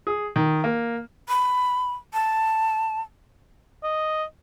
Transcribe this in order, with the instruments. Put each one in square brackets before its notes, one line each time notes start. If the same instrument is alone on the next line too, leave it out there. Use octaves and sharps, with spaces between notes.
[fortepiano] G#4
D#3
A#3
[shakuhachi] B5
A5
[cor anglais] D#5